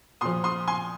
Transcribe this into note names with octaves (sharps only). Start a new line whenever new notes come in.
A#2 F3 C6 D#6
C6 D#6
G#5 C6